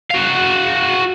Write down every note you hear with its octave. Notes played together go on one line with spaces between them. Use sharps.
F#4 F5